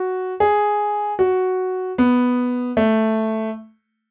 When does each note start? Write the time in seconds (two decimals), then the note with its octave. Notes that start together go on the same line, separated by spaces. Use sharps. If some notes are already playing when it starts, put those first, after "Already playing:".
Already playing: F#4
0.40 G#4
1.19 F#4
1.98 B3
2.77 A3